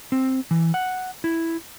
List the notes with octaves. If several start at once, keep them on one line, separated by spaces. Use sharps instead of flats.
C4
E3
F#5
E4